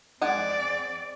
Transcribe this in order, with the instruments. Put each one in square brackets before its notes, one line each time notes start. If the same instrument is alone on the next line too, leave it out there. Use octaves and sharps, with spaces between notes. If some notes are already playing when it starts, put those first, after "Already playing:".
[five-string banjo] G#3 F#5 G#5 [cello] C4 D5